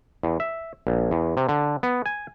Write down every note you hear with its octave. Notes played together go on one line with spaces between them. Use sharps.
E2
E5
A#1
E2
C3
D3
B3
G#5